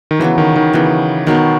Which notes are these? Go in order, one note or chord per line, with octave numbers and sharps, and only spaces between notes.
D#3
C#3 E3 F#3 B3
D#3
D#3
C#3 E3 F#3 B3
B2 D#3 F#3 B3